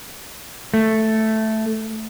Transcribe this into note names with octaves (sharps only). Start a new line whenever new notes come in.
A3